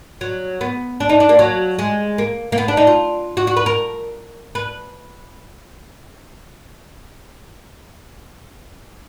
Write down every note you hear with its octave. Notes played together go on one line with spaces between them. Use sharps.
F#3
B3
D4
D#4
D4
A#3
F#3
G#3
A#3
A#3
B3
D4
D#4
F4
F#4
F#4
B4
A#4
B4